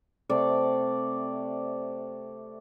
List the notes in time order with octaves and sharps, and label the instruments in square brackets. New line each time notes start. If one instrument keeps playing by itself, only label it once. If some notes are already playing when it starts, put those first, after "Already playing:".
[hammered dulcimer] C3 A3 D5